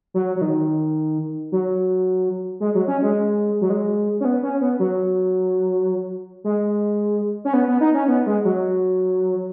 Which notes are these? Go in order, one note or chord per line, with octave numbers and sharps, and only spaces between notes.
F#3
F#3
D#3
F#3
G#3
F#3
C#4
G#3
F#3
G#3
C#4
B3
C#4
B3
F#3
G#3
C#4
B3
B3
D#4
C#4
B3
G#3
F#3